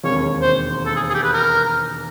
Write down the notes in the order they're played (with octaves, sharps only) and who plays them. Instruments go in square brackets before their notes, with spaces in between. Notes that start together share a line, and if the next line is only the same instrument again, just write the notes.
[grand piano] E1 D#2 D#3 G#3 C4 [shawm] C#5
[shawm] C5
A4
G#4
G#4
G4
B4
A#4